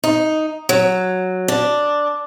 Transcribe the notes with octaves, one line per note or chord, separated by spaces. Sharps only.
D#4
F#3
D4